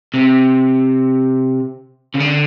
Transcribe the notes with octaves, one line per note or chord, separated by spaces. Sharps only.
C3
C#3
D3